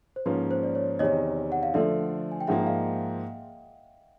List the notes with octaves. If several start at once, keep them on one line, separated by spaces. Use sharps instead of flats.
C5
G#2 F3 A#3 C#4 F4 B4
C5
D5
C#5
E2 C3 D#3 C#5 D#5
F#5
F5
D3 F3 A3 D5 E5
G#5
G5
G#2 F3 A#3 E5 F#5
D#5 F5